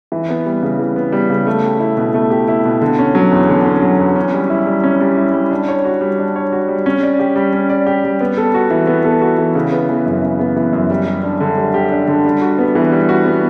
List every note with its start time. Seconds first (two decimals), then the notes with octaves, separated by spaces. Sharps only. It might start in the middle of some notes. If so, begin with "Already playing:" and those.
0.12 E3
0.29 B3
0.46 G3
0.63 C#3
0.79 E3
0.96 B3
1.12 G3
1.30 C#3
1.47 A3
1.64 G4
1.80 E4
1.97 B2
2.14 A3
2.30 G4
2.48 E4
2.65 B2
2.81 D3
2.99 C#4
3.15 F#3
3.32 E2
3.49 D3
3.66 C#4
3.82 F#3
3.99 E2
4.16 C#4
4.34 G3
4.50 E4
4.67 G3
4.84 C#4
5.01 G3
5.17 E4
5.33 G3
5.51 D4
5.68 C#5
5.85 F#4
6.01 G3
6.19 D4
6.36 C#5
6.53 F#4
6.68 G3
6.86 C#4
7.03 D5
7.19 G4
7.36 G3
7.53 C#4
7.70 D5
7.86 G4
8.04 G3
8.21 B3
8.37 A4
8.54 F#4
8.71 E3
8.87 B3
9.04 A4
9.22 F#4
9.38 E3
9.55 C#3
9.72 B3
9.89 E3
10.05 F#2
10.22 C#3
10.39 B3
10.56 E3
10.73 F#2
10.90 G3
11.06 G4
11.23 D4
11.40 D3
11.57 G3
11.74 G4
11.91 D4
12.07 D3
12.25 G3
12.42 F#4
12.58 B3
12.75 E3
12.92 G3
13.09 F#4
13.26 B3